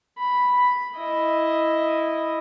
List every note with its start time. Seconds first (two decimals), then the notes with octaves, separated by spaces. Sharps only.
0.18 B5
0.97 E4 D#5